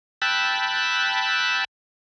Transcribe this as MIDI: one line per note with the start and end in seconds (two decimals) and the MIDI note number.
0.22 1.64 79
0.22 1.64 81
0.22 1.64 83
0.22 1.64 88
0.22 1.64 90